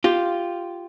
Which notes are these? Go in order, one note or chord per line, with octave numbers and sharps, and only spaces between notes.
F4 G4